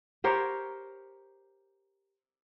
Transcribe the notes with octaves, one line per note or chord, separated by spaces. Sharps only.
G4 A#4 C5 C#5